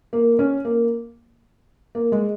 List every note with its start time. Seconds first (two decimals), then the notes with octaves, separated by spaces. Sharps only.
0.13 A#3
0.39 C#4
0.65 A#3
1.95 A#3
2.12 G#3